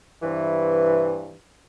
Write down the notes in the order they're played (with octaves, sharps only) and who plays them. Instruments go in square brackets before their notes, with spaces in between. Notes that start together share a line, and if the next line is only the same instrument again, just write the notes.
[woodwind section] G2 C3 E3